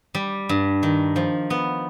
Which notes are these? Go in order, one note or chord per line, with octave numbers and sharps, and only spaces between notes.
G3
G2
D#3
F3
B3